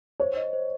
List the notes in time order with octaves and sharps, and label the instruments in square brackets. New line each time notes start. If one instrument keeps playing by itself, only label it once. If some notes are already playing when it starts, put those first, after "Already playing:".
[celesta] C5 [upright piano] C#5
[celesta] D#5
C5